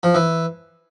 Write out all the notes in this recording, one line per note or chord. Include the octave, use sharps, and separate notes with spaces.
F3
E3